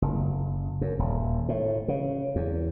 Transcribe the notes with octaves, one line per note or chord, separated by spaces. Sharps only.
F#1
F#2
D#1
A2
C#3
E2